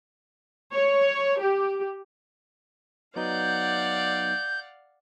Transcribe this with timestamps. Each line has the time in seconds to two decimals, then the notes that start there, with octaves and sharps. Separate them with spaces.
0.74 C#5
1.41 G4
3.16 F#3 B3 D#4 D5 F5 F#5 G6